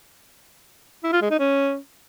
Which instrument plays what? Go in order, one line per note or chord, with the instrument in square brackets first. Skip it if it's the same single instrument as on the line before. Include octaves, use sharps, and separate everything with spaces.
[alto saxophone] E4
F4
G#3
D#4
C#4